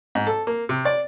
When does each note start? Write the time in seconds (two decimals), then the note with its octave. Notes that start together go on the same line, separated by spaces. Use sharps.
0.15 G#2
0.27 A4
0.47 A#3
0.69 C3
0.85 D5